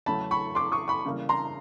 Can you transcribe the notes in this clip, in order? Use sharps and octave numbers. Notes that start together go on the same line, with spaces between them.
E2 C#3 F#3 A3 C#4 A5 B5
B5 C#6
C6 D6
C#6 D#6
B5 C#6
C#3 E3 G3 A#3
A#5 C6